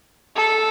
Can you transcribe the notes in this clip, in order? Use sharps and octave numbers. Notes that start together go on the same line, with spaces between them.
A4